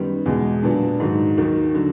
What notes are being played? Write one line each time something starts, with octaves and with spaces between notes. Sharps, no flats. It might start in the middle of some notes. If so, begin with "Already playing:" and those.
Already playing: F#2 D#3 G3 B3
E2 B2 G#3
A#2 F#3 B3 D4
G#2 D#3 F#3
D#2 D#3 F#3
D3 F#3